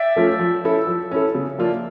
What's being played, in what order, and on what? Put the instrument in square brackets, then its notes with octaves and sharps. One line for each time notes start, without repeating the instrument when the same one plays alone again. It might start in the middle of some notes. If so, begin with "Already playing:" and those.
Already playing: [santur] D5 E5 G5
[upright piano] F3 A3 C#4 F4
F3
C#4 E4 A4
F3
C#4 E4 A4
C#3
F3 A#3 D4 F4